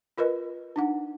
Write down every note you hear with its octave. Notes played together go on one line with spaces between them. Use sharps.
F4 A#4 B4 D#5
D4 D#4 F#5